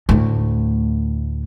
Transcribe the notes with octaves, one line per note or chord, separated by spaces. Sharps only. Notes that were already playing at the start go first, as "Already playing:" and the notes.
D2 A2